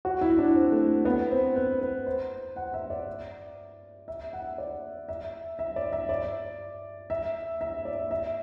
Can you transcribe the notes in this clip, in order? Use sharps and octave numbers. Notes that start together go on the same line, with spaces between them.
F#4
E4
D4
C4
A3
B3
C4
B4
B4
C5
F#5
E5
D5
E5
F#5
D5
E5
E5
D5
E5
D5
E5
E5
D5
E5